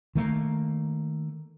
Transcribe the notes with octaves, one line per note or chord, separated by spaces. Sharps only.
D#3 A3 A#3